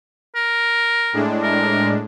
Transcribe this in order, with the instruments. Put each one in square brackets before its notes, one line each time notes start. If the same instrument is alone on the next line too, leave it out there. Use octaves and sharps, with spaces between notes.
[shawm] A#4
[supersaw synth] A2 G#3 D4
[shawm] A#4